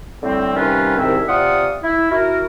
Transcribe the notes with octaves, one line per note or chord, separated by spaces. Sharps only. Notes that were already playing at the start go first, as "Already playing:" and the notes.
A2 D3 G3 C4
C3 D#3 G3 C#4 F4 B4
C2 G#2 D#3 C4 C#4 E5
C3 F4 D5 F#5 D#6
E4
E4 F#4 A#4